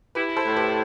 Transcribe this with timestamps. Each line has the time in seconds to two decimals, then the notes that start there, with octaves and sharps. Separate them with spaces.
0.15 E4 G4 B4
0.37 A4 C5
0.46 A2
0.56 G4 B4